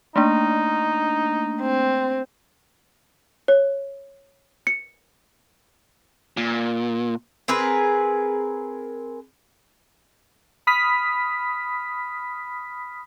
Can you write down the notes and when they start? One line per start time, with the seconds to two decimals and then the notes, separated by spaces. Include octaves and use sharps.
0.16 A3 A#3 D4 D#4
1.61 C4
3.48 C#5
4.67 C#7
6.37 A#2
7.48 C4 G#4 A#4 B4
10.67 B5 D#6 F6 B6